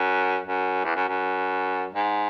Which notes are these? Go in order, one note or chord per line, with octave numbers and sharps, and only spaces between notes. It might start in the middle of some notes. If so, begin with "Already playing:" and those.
Already playing: F#2
F#2
E2
F#2
F#2
G#2